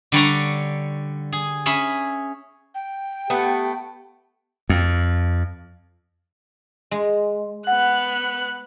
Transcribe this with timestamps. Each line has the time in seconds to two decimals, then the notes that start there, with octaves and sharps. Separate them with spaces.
0.12 D3 G3 C#5 A#5
1.32 G#4
1.66 C#4 G#4 E5 B5
2.75 G5
3.30 A3 B3 G4 F#5
4.69 F2
6.91 G#3
7.67 B3 F#5 F#6